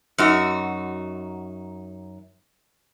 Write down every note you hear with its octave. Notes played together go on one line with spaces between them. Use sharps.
F#2 D#4 F#4